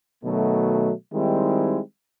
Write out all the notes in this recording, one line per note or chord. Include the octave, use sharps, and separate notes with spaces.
B2 D#3 F#3 A3
D#3 G3 G#3 C4 D#4 E4